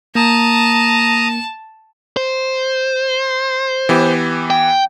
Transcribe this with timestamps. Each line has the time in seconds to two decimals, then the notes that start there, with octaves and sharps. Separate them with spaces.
0.15 A#3 A5 A#5 D#6
2.17 C5
3.89 E3 B3 G4
4.50 G5